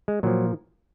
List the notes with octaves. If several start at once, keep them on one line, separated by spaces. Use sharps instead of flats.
G#3
A#2 F3 F#3